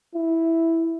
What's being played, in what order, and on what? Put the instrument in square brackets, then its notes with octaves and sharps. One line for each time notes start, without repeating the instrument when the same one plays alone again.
[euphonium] E4